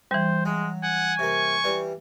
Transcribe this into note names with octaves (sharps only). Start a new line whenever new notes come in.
E3 G3 C5
F#3 G#3
F#5 G#5
C3 A#3 C#6
E3 G3